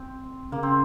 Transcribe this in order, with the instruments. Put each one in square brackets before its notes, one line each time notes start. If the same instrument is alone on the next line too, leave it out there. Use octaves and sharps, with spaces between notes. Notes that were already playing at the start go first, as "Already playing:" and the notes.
Already playing: [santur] C4
[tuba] C#3 [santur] A#3
[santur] C4